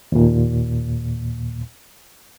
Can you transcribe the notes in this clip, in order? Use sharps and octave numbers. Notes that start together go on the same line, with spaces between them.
D#2 A#2